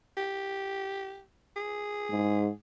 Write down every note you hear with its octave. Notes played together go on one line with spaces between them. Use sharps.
G4
G#4
G#2